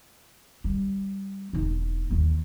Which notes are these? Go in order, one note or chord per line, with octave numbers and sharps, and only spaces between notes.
G3
E1 D#4
D#2 E3